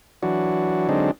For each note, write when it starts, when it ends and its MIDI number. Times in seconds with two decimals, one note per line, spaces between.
0.23 0.88 52
0.23 0.88 54
0.23 0.88 62
0.23 0.88 66
0.89 1.11 50
0.89 1.11 54
0.89 1.11 56
0.89 1.11 60
0.89 1.11 62
0.89 1.11 63